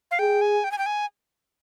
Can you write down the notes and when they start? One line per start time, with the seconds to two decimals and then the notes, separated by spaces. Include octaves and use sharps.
0.11 F5
0.19 G#4 G5
0.41 G#5
0.64 G5
0.71 G#5
0.78 G5
0.86 G#5